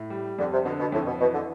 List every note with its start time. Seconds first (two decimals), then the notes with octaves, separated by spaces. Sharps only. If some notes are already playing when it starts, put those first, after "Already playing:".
Already playing: A2
0.10 G3
0.38 F2 D3
0.52 C3
0.65 B2 D3
0.80 B2
0.92 F2 A2
1.06 B2
1.20 B2 E3
1.33 D3